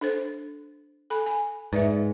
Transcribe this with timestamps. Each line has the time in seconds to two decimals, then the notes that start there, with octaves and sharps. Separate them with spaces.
0.01 D4 A4 C5
1.10 A4 G#5 B5
1.26 G#5
1.73 G#2 B4 D5 E5